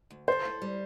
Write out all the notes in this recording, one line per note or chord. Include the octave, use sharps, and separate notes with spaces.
D2
A4 C5
E4
G3